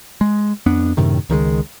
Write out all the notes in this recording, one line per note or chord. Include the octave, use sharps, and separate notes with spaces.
G#3
F2 B3 D4
F#2 A2 C3 D#3
C#2 D#3 F3 G#3